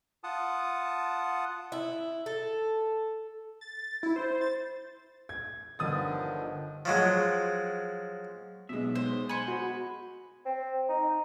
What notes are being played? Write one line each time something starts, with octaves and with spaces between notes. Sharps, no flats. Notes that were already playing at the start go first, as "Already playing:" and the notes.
F4 F#5 A5 D#6
E4
A4
A6
A6
E4
C5
A6
G#6
G1 D3 D#3 F3 D#6 A6
F3 F#3 G#3
B1 F2 B2 G#3 E5
C5
C5 G#5 B5 C#6
F#4
C4
D#4